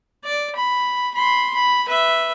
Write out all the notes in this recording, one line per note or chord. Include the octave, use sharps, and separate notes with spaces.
D5
B5
B5 C6
B5
B4 E5